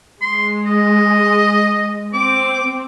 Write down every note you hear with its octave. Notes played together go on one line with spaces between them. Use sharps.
G#3 C6
D#5
C4 D6